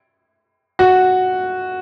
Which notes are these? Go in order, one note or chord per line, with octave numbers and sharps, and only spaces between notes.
F#4